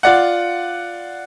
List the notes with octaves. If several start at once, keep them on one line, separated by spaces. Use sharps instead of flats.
F4 D5 F#5